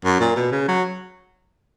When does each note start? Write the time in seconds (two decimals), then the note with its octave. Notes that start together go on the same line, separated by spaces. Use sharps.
0.04 F#2
0.20 A#2
0.36 B2
0.52 C#3
0.68 F#3